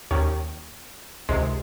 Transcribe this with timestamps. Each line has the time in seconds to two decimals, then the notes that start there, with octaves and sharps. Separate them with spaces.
0.11 D#2 D#3 C#4
1.29 C#2 C3 D#3 G#3